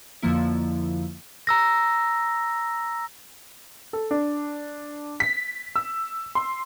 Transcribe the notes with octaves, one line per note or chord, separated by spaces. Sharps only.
F2 D3 F3 A#3 E4
A#5 E6 A#6
A4
D4
B6
E6
C6